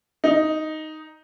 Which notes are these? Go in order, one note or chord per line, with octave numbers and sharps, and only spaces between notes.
D#4